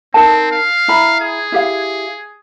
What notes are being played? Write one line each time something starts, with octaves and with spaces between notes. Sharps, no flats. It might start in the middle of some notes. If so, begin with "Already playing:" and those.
C4 D#4 A#4 A5
F5
E4 A#5 B5
G#4
E4 G4 F5